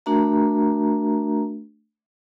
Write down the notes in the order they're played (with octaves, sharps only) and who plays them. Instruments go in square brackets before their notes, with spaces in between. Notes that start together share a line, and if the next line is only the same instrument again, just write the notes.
[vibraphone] A3 D4 F#4 A#4 E5 A#5